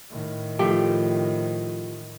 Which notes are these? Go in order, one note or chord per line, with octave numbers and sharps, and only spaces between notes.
A2 D#3
F3 A3 G4